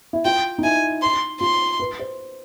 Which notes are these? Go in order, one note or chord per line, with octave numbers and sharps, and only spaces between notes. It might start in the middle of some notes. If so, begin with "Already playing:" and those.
E4
F4 G5
D#4
E4 G#5
C6
F4 C6
B4
C5